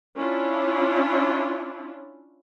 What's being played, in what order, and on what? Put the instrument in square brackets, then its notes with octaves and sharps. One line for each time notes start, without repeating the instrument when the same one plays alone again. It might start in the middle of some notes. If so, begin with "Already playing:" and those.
[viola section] C#4 D4 E4 F4